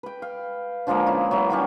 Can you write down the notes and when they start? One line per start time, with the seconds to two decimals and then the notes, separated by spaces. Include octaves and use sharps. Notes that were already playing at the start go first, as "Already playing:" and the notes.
0.03 B4 G5
0.22 F5
0.87 D3 F3 G#3 A#3
1.06 C#4 E4
1.31 F#3 B3 E4
1.50 D#3 G3 C#4